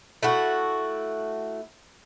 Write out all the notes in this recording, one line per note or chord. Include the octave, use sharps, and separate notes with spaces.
A3 E4 F#4